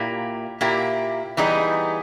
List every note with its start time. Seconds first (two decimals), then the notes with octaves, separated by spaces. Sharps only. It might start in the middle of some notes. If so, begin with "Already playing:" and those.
Already playing: A#2 A#3 E4 G4
0.61 A#2 A#3 E4 G4
1.37 E3 G3 B3 D#4 G#4